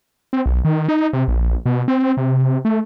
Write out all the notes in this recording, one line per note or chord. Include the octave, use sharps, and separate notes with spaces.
C4
B1
D#3
D#4
C3
A#1
B2
C4
C3
A3